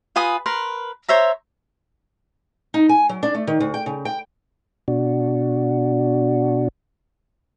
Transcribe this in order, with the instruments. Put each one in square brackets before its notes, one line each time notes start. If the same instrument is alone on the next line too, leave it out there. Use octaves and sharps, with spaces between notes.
[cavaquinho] F4 B4 G#5 D#6
A#4 B4 C6
C5 C#5 E5 A#5
[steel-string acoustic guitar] D#4
G#5
F#3
D4
A3
D#3
D2
G5
C#3
G5
[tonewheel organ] B2 D4 F#4